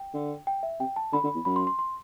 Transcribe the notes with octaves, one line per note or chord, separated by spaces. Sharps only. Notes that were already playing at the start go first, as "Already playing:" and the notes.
Already playing: G5
D3
G5
E5
C3 G5
A5
D3 B5
D3
E2
F#2 B5
C6
C6
C6